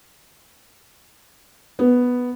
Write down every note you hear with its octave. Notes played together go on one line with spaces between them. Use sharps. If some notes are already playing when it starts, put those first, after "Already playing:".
B3